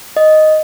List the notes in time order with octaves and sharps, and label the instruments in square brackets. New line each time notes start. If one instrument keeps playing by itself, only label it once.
[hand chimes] D#5